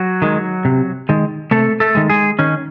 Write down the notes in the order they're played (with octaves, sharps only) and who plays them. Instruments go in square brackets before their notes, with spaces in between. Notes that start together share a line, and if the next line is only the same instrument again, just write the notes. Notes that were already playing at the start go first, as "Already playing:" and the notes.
Already playing: [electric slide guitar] F#3 F#4
D#3 G#3
C3
D#3 G#3
C3 A3 A4
A3 A4
D#3 G#3
G#3 G#4
D#3 C#4